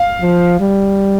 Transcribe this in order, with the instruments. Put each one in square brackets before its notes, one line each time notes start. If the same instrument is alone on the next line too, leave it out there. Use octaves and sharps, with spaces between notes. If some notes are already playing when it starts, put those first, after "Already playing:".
Already playing: [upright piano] F5
[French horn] F3
G3